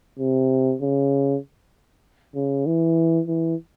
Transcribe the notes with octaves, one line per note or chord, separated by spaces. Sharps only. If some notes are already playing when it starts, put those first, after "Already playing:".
C3
C#3
C#3
E3
E3